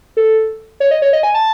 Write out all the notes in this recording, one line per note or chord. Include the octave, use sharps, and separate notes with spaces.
A4
C#5
D#5
C#5
D#5
G#5
A5